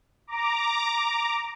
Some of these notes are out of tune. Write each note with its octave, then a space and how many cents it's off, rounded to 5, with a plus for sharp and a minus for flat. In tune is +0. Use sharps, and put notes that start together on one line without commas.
A#5 +0 D6 +0